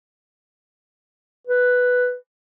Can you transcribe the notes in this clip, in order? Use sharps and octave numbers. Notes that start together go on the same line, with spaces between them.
B4